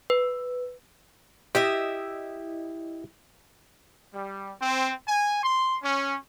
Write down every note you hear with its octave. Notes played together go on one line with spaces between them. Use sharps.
B4
E4 G4 D#5 E5
G3
C4
G#5
C6
C#4